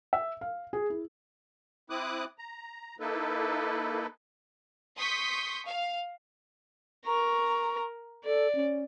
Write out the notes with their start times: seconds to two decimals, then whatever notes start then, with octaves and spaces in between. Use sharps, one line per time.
0.13 E5
0.41 F5
0.73 G#4
0.90 E4
1.90 C4 E4 D6 D#6 F#6
2.38 A#5
3.00 A#3 D#4 E4 A4 B4
4.99 C6 C#6 D#6 G6 B6
5.67 F5
7.06 A#4 A#5 C#6
8.25 A4 D5
8.55 C#4